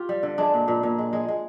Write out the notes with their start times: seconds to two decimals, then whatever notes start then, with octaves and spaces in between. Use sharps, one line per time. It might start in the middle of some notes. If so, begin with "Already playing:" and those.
Already playing: F4 G4
0.09 G3
0.23 D3
0.38 G#3 D4
0.54 A#2
0.68 A#2
0.83 A#2
0.98 G#3
1.13 G#3
1.28 G#3